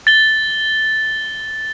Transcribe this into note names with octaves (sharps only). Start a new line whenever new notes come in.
A6 G7